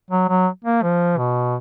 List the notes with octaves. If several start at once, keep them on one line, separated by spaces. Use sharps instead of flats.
F#3
F#3
A#3
F3
B2